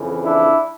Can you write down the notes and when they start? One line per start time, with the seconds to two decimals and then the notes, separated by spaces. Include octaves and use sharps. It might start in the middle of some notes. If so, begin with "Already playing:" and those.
Already playing: F2 C#3 E3
0.24 D4 E4